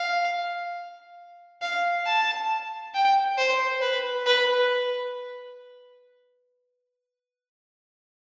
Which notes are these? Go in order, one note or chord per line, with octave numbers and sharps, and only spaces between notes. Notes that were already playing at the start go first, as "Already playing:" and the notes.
Already playing: F5
F5
A5
G5
C5
B4
B4